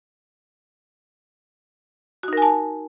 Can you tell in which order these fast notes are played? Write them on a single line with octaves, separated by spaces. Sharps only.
F#4 D#4 A#4 G#5 A5